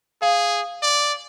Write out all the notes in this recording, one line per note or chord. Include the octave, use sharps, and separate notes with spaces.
G#4 F5
D5